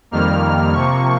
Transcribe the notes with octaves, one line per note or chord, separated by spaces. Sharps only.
F2 D#3 G3 A#3 F6
C3 F3 A#3 C#6